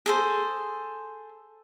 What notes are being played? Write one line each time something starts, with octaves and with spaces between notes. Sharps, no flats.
G#4 A4 C5